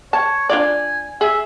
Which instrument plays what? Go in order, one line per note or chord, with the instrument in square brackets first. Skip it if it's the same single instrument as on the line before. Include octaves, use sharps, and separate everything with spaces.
[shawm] C#5 [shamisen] A5
[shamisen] D4 F4 D5 [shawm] G#5
[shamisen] G#4 [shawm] E5